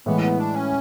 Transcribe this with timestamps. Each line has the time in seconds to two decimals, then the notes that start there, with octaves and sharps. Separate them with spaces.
0.06 A2 E3 G#3 B3
0.21 B3
0.38 D4
0.54 C#4